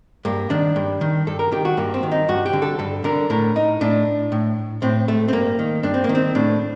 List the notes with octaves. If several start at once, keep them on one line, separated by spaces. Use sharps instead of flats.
G2 A#3
D#3 D4
G2
D#3
G2 A4
A#4
D#3 G4
F#4
G2 A#3
C4
D#3
D#4
G2 F#4
G4
D3
A4
G2 A4
D3 A#4
A2 A#4
D#4
A2 D4
A2
A2 C4
A3
C4
G2 A#3
D#3
G2 D4
C4
A#3
D#3
C4
A2 D4